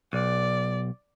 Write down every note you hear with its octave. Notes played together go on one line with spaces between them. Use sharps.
B1 D5